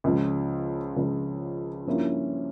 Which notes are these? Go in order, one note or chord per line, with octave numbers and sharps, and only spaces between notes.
C#2 C#3 F3
C#2 C#3 F3
G2 F3 A#3 C#4 E4